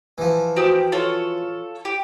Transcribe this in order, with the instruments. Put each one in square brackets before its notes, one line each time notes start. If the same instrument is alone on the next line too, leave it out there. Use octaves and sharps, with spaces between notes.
[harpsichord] E3 F3
[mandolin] C4 G4 [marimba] F#4 D#6
[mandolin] F4 A4 C#5
G4